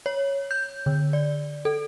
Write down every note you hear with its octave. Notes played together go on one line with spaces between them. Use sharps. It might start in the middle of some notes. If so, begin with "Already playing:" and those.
C#5
G6
D3
D5
A4